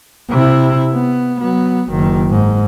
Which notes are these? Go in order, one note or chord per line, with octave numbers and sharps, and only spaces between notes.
C3 E4
B3
F#3 B3
F#1 D#3
G#2